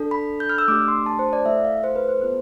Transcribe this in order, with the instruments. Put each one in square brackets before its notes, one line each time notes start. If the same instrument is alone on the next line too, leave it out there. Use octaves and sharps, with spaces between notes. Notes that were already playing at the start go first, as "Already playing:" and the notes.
Already playing: [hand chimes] D4 A4
B5
G6
F6
E6
A3 D4 G4 D6
C6
A5
C5
D5
A3 E4 A4 E5
F5
C5
B4
C5
B3 F4 A4 C5